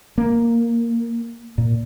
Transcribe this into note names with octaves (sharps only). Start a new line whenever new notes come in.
A#3
A#2